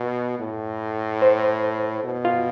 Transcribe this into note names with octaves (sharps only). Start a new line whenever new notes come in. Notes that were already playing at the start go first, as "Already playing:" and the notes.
Already playing: B2
A2
C5
B2
F4